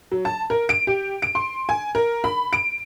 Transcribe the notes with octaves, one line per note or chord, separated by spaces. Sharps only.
F#3
A5
A#4
D7
G4
D7
C6
G#5
A#4
B5
D7